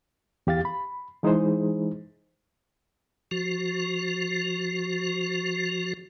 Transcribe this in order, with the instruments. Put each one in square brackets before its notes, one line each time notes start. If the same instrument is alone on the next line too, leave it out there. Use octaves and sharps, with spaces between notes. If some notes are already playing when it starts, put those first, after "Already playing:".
[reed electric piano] E2 G4 F5 A6
B5
E3 G#3 D#4 E4 G#4 C5
[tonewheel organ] F3 F#4